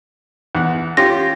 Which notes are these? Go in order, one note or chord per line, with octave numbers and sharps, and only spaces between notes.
E2 F#5
C#4 F4 G4 A#6